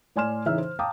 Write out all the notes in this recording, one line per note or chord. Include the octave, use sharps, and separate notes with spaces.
A2 D5 G#5 C6 F6 E7
C#3 E3 D#4 E5 F6
C5
F5 G5 A5 A#5 D6 D#6